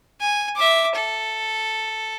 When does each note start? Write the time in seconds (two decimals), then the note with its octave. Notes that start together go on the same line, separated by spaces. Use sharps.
0.21 G#5
0.56 E5 D6
0.95 A4